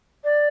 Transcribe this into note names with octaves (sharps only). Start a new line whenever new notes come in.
D5